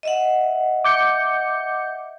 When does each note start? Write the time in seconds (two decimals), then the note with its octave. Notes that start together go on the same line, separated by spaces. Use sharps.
0.03 D#5 E5 F#5
0.84 D6 G6 C#7